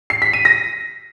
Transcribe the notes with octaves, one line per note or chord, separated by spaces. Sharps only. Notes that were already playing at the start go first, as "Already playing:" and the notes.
C7
B6
D#7
A#6